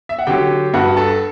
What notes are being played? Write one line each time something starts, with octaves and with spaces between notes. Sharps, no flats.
E5
F#5
D3 F#3 G4 G5
G2 F#4 F#5
A4 A5